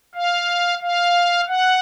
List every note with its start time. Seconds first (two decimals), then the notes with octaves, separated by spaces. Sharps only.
0.15 F5
0.82 F5
1.48 F#5